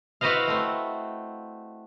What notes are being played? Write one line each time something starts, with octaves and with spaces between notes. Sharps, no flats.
E4 F#4 B4 C5 D#5 F5
A3 C4